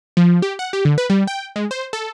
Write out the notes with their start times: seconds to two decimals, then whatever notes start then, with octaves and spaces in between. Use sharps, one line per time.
0.17 F3
0.42 G4
0.59 F#5
0.73 G4
0.85 D3
0.98 B4
1.10 G3
1.27 G5
1.56 G#3
1.71 C5
1.93 A4